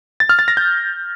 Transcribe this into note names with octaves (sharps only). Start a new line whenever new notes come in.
A6
F6
A6
A#6
G6